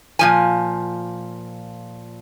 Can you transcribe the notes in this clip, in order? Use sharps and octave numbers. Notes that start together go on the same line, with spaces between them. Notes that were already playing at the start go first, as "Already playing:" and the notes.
A#2 F3 G#5